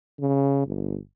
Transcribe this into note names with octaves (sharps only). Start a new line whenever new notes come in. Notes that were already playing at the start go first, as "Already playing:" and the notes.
C#3
G1